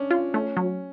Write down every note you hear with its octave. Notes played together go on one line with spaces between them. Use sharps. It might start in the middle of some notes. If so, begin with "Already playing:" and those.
Already playing: C#4 D4
F4
A3 C#4
F#3